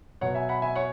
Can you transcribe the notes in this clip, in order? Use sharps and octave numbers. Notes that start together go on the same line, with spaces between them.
B2 F#3 C#5 F#5
E5 G#5
F#5 B5
E5 G#5
C#5 F#5